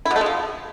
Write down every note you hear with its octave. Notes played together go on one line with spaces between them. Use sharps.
E4
B2
A3
G#3
F3